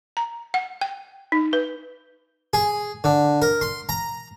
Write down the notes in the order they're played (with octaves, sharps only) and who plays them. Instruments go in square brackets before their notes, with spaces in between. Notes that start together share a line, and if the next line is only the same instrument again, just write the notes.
[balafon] A#5
F#5
G5
D#4
B4
[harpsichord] G#4
D3
A#4
C6
A#5